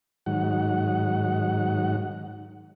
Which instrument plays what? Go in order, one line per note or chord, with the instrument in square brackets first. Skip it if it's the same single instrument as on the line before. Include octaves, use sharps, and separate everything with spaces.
[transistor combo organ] G#2 D#3 F#3 F#5